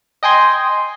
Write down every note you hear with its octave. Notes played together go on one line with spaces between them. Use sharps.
D#5 G5 G#5 C6